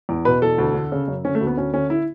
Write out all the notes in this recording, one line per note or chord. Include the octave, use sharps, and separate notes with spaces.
E2
B2 B4
E2 A4
D2
D3
C#3
F#2
D3 C#4
A3
D2
B3
D2 C#4
D3 C#4
E4